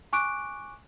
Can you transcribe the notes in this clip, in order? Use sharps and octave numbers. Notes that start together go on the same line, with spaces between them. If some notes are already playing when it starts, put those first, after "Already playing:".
G#5 C#6 D6 F#6 D7